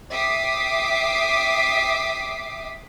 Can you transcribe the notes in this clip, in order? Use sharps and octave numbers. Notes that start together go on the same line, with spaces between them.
E5 G5 D6 D#6 B6 C7